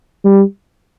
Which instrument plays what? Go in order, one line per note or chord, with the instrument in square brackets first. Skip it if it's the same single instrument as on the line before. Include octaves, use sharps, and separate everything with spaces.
[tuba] G3